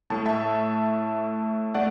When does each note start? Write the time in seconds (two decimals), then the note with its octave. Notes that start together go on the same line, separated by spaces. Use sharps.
0.10 A2 A3 A5
0.26 E5 A5
1.74 A3 D5 F#5